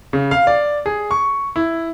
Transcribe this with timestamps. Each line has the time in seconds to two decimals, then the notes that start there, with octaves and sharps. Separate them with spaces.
0.13 C#3
0.31 F5
0.47 D5
0.86 G#4
1.11 C#6
1.56 E4